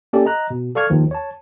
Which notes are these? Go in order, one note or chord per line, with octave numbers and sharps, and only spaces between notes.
A#3 C#4 G4 A4 D5
D#5 A#5 F#6
B2
A4 D5 F5 C#6 F6 G#6
D#2 D#3 F3
C#5 A5